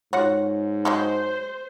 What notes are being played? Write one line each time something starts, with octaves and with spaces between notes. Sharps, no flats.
G#2 F4 F#4 C#5 F#5
F#3 G#3 A4 C5